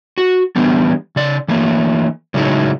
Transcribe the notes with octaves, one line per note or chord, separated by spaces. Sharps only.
F#4
D3 E3 G3 B3
C#3 D5
E3 A3 A#3
A2 C#3 F#3 G#3 A3 D#4